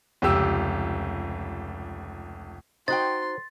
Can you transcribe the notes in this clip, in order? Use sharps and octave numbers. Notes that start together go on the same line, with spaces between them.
F1 C#2 G4 E6
D#4 F#4 C5 G5 C6 A6